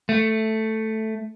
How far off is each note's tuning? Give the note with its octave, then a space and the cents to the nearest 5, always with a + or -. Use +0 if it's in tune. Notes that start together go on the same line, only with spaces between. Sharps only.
A3 +0